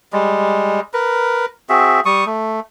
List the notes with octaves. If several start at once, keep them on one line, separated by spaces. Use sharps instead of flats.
G3 G#3
A#4 B4
C4 F#4 G#4 E5
G3 C#6 D#6
A3